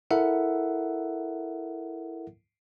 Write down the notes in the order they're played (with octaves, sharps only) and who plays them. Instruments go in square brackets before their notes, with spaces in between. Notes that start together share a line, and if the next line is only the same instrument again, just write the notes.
[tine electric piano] E4 A4 A#4 E5 F#5